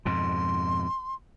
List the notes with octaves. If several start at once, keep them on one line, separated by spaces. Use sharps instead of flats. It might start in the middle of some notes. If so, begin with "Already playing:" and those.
F2 G#2 B2 C6